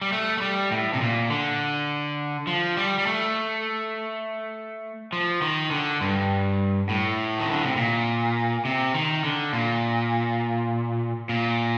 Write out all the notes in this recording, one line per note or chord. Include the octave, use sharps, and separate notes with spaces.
G3
A3
A3
G3
A2
C3
A#2
D3
F3
G3
G3
A3
F3
D#3
D3
G2
A2
D#3
D3
C3
A#2
C3
D#3
D3
A#2
A#2